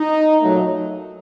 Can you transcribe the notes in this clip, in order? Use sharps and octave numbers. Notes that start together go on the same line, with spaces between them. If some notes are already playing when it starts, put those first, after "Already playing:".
Already playing: D#4
A#2 F#3 A3